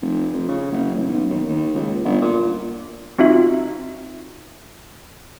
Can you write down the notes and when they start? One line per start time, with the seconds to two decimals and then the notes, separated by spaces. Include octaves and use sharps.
0.02 F1
0.33 F2
0.48 C#3
0.72 F#1
0.95 A1
1.07 B1
1.30 D#2
1.48 D#2
1.74 C#2
2.05 G1
2.21 A#2
3.19 C4 D#4 F4 F#4 E5